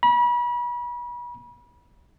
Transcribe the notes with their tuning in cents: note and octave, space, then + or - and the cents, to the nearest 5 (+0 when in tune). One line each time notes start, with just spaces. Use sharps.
B5 -35